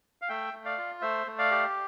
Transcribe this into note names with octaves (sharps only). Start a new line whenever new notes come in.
F5
A3 E5 G5
A3
D5 F5
F4
A3 C5 E5
A3
D5 F5
G4